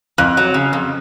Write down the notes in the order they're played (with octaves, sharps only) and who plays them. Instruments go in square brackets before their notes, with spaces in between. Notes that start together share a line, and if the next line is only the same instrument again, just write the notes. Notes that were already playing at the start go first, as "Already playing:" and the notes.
[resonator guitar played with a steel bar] F2 [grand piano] F#6
[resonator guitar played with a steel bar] F#3
C#3
F2